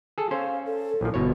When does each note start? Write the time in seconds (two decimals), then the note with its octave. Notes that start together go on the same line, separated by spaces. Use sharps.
0.18 G#4 A4
0.31 C#4 C5 F5
0.66 A4
1.01 A#1 F3 E4
1.14 G1 B2 C#5